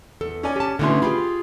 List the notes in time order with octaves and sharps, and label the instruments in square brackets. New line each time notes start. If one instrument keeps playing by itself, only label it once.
[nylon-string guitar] E2 A4
[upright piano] C#4 D5 G#5
[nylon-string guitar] G4 A5
[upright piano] B2 E3 C6 [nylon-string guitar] D3 A3 C#4
[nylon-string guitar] F4 G4 [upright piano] G#4 B5 C6